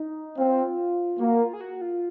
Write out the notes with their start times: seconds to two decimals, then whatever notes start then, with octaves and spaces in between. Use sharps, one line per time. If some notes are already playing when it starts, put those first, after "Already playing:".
Already playing: D#4
0.38 C4 F4
1.19 A#3 F#4
1.40 F4
1.53 G#4
1.61 F#4
1.81 F4